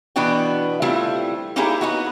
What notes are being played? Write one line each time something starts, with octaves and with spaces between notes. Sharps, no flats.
B2 E3 B3 D4 F#4 G5
G3 A3 C4 E4 F4
A#3 C#4 D#4 E4 G4 G#4
B3 D#4 F#4